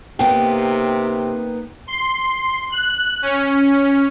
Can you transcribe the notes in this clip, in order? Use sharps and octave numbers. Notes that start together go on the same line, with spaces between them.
C3 A#3 B3 D#4 G5
C6
F#6
C#4